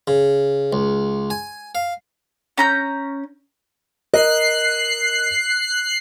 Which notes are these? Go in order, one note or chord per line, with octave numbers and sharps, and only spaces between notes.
C#3
C#2
G#5
F5
C#4 A#5 G6
A#4 D#5 F#6 C7